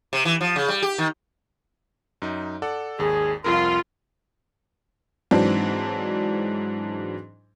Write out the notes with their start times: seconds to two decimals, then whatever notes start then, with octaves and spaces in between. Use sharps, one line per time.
0.13 C3
0.25 E3
0.41 F3
0.56 C#3
0.68 G3
0.82 G4
0.98 D#3
2.22 F#2 D#4
2.62 A4 D5 F#5
2.99 G#1 D#2 G#4
3.44 C2 F2 F4 A#4 C6
5.31 G#2 E3 F#3 C4 D4